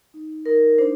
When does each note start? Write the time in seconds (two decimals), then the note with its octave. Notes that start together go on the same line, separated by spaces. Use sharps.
0.14 D#4
0.46 D#4 A#4
0.78 D4 C5